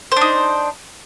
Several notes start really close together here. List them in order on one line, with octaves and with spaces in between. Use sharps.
C5 D4 D#4